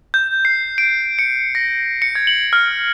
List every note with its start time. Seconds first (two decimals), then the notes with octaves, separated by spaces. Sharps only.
0.14 G6
0.45 C7
0.78 D7
1.19 C#7
1.55 A#6
2.02 C#7
2.15 G#6
2.27 F#7
2.53 F6